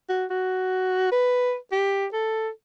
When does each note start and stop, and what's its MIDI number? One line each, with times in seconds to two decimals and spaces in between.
0.09 0.25 66
0.30 1.11 66
1.12 1.55 71
1.72 2.06 67
2.13 2.49 69